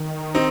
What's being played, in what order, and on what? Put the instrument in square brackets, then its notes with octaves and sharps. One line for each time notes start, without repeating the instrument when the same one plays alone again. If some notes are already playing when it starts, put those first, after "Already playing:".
Already playing: [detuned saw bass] D#3
[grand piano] C4 D#4